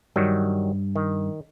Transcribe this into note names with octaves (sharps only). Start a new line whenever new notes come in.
G2 D#3 F#3 G3
D#3